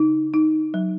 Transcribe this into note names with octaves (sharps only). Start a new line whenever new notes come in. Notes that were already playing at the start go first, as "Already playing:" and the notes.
Already playing: C#3 D#4
D#4
F#3